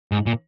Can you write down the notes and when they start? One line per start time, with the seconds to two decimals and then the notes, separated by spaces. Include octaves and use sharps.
0.12 G#2
0.26 A#2